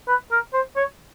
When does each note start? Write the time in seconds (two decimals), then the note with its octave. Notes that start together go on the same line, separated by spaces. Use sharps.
0.08 B4
0.32 A#4
0.54 C5
0.76 C#5